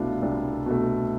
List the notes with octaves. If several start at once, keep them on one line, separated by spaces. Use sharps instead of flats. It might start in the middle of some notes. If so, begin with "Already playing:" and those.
Already playing: C2 B2 A3 D4 E4 F4
C2 D4
B2 A3